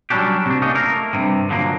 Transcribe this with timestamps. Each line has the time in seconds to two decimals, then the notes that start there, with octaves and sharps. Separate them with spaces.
0.10 F#3 G3 C#4 D4 G4
0.46 C3 D4
0.62 A#3 C#4 D#4
0.75 A3 A#3 A#4
1.13 G2 C3
1.50 D3 F3 F#3 A#3